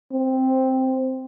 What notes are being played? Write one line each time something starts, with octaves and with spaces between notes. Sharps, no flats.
C4